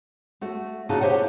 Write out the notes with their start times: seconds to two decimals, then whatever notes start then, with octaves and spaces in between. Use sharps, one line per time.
0.41 A3 F#4
0.89 A#2 C#3 D#4 F#4 F5 A5
1.01 E4 G4 C5 C#5 F#5